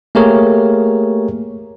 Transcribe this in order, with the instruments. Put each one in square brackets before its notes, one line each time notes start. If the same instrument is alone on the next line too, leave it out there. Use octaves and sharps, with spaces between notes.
[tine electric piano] A3 A#3 G4 G#4 A#4 C#5